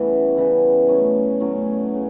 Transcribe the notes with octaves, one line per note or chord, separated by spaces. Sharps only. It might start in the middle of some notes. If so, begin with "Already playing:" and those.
Already playing: C#3 E3 G3 A3 B3 E4
C#3 E3 G3 B3
A2 F#3 C#4
A2 F#3 C#4
C#3